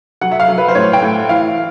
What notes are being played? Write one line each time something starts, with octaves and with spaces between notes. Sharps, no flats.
F#3 F#5
E5
F5
F#3
B4
C5
A2 C#5
G5
A2
E3 F5